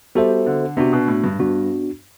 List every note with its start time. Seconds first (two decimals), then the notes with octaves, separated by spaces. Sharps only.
0.15 G3 B3 F#4 A4 C5 E5
0.47 D3
0.77 C3 B3 D4 F#4
0.93 B2
1.08 A2
1.24 G2
1.39 G2 B3 D4 F#4